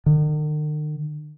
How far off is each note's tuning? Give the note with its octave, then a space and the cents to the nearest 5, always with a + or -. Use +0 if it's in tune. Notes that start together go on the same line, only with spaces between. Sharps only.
D#3 -45